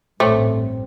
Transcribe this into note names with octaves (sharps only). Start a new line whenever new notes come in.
A1 G2 A#2 A3 C4 C#5